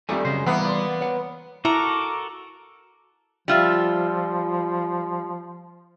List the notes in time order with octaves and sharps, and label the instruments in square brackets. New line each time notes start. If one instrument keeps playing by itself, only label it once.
[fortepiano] F2 G3 [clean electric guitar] D#3 A3 [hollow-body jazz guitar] A4 D5 G#5
[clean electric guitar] F#2 G#3 C5 [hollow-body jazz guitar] C#3
[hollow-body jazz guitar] E3 G3 [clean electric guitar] A#3 [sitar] B3 [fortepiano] E5 F#5
[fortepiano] D5 C6
[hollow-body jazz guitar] C#5 F#5
[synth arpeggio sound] E4 [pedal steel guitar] F#4 A4 A#4 [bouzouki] A#5 [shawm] D6
[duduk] F3 [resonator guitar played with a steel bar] G3 F4 E5